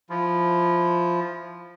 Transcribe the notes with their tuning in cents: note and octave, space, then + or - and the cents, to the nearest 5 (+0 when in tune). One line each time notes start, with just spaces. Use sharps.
F3 +0 E4 +5